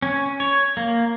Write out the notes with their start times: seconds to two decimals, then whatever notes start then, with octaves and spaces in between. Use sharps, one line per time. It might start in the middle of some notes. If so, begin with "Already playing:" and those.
0.02 C#4
0.40 C#5
0.77 A#3